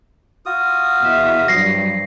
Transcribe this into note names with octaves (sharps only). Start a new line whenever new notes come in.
F4 F#4 D#6
E2 B2 E5
G2 F3 F#3 A#6 C7